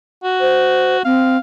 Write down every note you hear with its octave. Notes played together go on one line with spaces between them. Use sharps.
F#4
C5
C4 F5